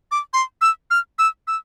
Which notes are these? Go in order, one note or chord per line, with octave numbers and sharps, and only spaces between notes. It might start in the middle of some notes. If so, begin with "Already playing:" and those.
D6
C6
E6
F6
E6
E6